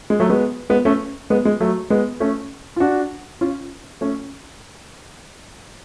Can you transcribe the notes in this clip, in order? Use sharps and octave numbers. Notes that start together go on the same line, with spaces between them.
G#3
F#3 A3
G#3 B3
G#3 B3
A3 C#4
G#3 B3
G#3
F#3 A3
G#3 B3
A3 C#4
F4
D4 F#4
C#4 F4
A3 C#4